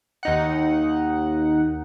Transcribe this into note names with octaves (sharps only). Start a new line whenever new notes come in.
D#2 D#4 F#5